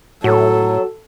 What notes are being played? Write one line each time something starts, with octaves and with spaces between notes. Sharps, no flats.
A2 F#3 F#4 A4